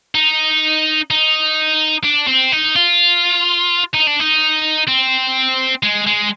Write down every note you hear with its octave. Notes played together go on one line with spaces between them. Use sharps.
D#4
D#4
D4
C4
D#4
F4
D#4
D4
D#4
C4
G#3
G#3